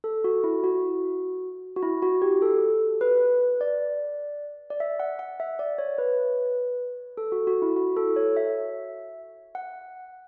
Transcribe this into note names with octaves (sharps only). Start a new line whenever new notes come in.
A4
F#4
E4
F#4
F#4
E4
F#4
G4
A4
B4
D5
D5
E5
F#5
F#5
E5
D5
C#5
B4
A4
F#4
F#4
E4
F#4
A4
C#5
E5
F#5